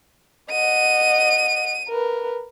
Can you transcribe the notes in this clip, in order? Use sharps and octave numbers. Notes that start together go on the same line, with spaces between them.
D#5 F#5 D#7
A#4 B4